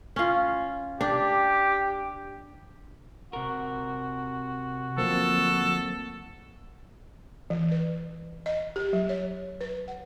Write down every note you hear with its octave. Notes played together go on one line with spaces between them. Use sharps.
C#4 F4
D4 G4
C3 F#4 A#4
D2 F3 F#3 A#3 C4 A4
E3
B4
D#5
G4
F#3
C#5
B4
F#5